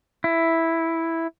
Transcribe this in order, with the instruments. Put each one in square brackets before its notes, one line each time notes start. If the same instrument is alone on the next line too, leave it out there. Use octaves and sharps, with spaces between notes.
[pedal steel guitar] E4